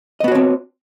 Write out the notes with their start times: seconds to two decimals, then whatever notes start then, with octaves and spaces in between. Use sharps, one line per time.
0.20 D#5
0.24 B3
0.28 F#4
0.32 C#5
0.35 C4